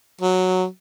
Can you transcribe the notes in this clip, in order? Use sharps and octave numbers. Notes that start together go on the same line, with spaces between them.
F#3